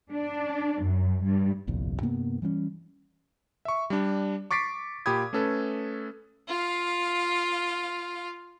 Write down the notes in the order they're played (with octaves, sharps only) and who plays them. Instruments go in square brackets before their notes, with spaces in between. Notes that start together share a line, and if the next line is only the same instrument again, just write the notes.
[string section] D4
F#2
G2
[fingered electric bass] G1 C2 F2 A#2
G2 C3 A#3 B3
E3 G3 A#3 C#4
[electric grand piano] E5 C#6
G3 D4
C#6 D6 A6 B6 C7 D7
A#2 G4 G5 B5 D#6 G#6
A3 C#4 A4 B4
[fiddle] F4 F5